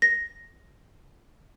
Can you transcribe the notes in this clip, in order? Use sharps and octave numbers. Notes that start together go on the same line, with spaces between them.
A#6